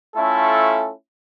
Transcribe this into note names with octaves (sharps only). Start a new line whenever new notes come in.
A3 C#4 E4 F4 A4